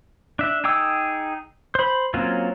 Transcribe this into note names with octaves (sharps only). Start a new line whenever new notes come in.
D4 E5
D#4 G#4 G5 D6 E6
C5 B5
F#3 A#3 C4 C#4 F4